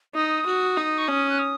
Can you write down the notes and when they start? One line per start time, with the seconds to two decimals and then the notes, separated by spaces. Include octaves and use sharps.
0.15 D#4 D#6
0.46 F#4
0.77 D#4
0.98 C#6
1.08 C#4 D#6
1.30 F#6
1.39 D#6